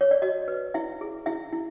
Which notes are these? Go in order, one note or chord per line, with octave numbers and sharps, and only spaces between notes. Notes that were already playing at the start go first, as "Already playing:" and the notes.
C#5
D5
F#4 D#5
B4
E4 E5
G#4
E4 E5
E4